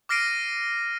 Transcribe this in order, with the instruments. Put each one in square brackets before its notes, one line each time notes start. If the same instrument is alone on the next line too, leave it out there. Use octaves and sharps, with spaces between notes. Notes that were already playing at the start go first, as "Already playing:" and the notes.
[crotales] D6 F6 A#6 C7 D7 D#7